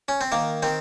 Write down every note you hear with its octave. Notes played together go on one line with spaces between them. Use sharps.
C#4
C4
D#3 A#3
D#3 C4